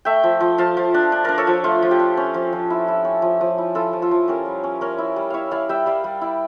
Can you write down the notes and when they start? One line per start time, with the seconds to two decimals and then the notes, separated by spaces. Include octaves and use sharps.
0.05 A3 E5 G5
0.23 F3
0.40 F3
0.58 F3 F5 A5
0.77 F3
0.94 D4
1.12 D4
1.24 D4 A#4 D5
1.38 A4 C#5
1.47 F3
1.64 A3 F4
1.82 F3
1.91 G4
1.99 D4
2.17 C#4
2.34 F3
2.53 F3
2.70 E4
2.88 E4
3.05 C#4
3.22 F3
3.41 F3
3.58 E4
3.75 E4 F4 A4
3.93 F3
4.02 F4 A4
4.11 F3
4.28 C#4 G4 A#4
4.46 G3
4.64 C#4
4.81 C#4 A#4 D5
4.98 E4
5.16 G3
5.30 E4 C#5 E5 F5
5.51 E4 D5 F5
5.69 G3 E5 G5
5.86 G3 D5 F5
6.04 G3
6.21 E4